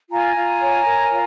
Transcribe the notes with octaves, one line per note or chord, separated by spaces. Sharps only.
F4 G#5 A#5
F4
C#5
A#4
F4